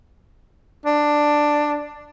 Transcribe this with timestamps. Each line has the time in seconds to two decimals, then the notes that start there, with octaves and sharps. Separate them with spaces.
0.86 D4